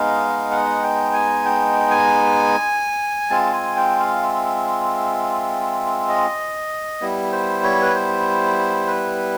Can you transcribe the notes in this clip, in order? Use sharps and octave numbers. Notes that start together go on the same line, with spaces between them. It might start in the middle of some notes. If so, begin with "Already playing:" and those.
Already playing: G#3 B3 D#4 F5
F#5
G5
G#5
G5
G#5
G#3 C4 F4 A5
G#5
G5
F5
E5
D#5
G3 B3 E4
C5
C#5
B4
C5
B4